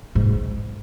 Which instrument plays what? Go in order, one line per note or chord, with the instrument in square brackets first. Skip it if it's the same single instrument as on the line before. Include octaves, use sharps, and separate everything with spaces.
[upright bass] G#2